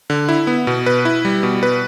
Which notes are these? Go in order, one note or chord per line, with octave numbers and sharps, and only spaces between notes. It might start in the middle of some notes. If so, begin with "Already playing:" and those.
D3
E4
B3
B2
B4
E4
G3
B2
B4